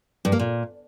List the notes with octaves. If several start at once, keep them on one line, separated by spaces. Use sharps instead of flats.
G2
A#3
A#2